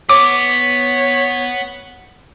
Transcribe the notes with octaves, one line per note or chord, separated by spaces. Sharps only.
B3 C#5 D6